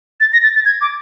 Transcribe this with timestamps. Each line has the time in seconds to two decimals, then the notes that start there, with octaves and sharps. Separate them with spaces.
0.20 A6
0.33 A#6
0.43 A6
0.55 A6
0.65 G#6
0.81 D6